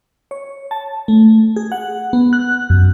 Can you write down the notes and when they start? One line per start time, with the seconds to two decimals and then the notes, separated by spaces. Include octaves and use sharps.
0.31 C#5
0.71 A5
1.08 A3
1.56 G#4
1.72 F#5
2.13 B3
2.33 F#6
2.70 F#2